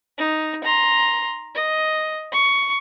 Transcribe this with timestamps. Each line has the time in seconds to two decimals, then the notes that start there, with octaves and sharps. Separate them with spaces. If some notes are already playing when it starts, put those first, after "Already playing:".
0.18 D#4
0.64 A#5 C6
1.55 D#5
2.32 C#6